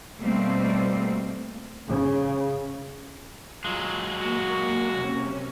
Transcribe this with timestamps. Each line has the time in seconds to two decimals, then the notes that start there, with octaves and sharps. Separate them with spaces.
0.17 B2 G3 A3 A#3 C4
1.88 C#3
3.64 F#3 G#3 F4
4.21 A#3 F#4
4.90 C3 C#4